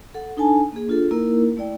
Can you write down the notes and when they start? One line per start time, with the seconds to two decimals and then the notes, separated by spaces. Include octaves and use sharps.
0.15 A4 F#5
0.37 D4 D#4 A4 G#5 A5
0.72 A#3 G#4
0.88 D4 F4 A4
1.11 A#3 D#4 E4 A#4
1.57 A3 E4 D5 G5